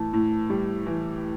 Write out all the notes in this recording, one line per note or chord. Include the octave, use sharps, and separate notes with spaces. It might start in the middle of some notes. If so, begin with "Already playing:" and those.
Already playing: A2 E3 A5
A2
G3
E3